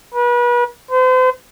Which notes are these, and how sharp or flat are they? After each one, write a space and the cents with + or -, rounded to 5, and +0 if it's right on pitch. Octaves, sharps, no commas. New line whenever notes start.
B4 -35
C5 -40